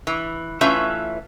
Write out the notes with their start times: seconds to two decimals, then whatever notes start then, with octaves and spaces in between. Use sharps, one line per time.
0.07 E3
0.61 E3 A3 C#4 F4 B4 E5